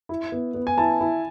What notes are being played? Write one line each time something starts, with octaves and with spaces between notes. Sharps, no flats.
E4
B3
B3
G#5
E4 A5
E4